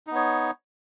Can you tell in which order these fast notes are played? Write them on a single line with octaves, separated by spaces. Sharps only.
D#4 B3 C#5